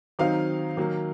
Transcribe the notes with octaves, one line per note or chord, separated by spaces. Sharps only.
D#3 F#3 C4 D#4 F5
D#3 F#3 A#3